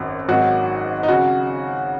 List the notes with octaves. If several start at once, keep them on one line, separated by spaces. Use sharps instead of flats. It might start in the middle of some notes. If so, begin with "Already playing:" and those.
Already playing: G#1 F#2 F#3
G#1 G#2 D#3 F#3 F#4
D#4
C#3 F#3 F#4